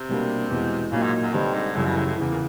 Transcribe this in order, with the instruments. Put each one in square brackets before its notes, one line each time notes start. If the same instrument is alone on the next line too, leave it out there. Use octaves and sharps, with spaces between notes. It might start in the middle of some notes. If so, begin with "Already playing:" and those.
Already playing: [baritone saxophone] C3
[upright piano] B2 G3 A#3 D4
E2 B2 G#3
[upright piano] A#2 F#3 A#3 D#4 [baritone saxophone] C#3
[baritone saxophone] G#2
F#2
[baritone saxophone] G2 [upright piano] D3 G3 C4 D#4
[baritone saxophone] G#2
[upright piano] F#2 C#3 E3 G3 [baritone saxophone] A2
[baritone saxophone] B2
A2
A2
[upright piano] E2 C#3 E3
[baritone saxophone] A#2